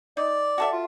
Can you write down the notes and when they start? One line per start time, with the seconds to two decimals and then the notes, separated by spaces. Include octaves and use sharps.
0.17 D#4 D5
0.58 F#4 A4 E5
0.73 F4